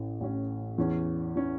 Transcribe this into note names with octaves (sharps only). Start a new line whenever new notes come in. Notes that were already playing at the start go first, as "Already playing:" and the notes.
Already playing: A1 A2 E3 C#4
A1 A2 E3 C#4
E2 E3 C#4
E3 C#4